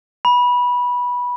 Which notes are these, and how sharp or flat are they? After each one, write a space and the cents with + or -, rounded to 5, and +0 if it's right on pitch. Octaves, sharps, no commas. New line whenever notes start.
B5 -15